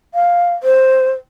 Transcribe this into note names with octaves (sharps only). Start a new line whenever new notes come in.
F5
C5